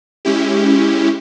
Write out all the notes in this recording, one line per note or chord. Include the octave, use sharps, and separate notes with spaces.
G#3 C#4 E4 G4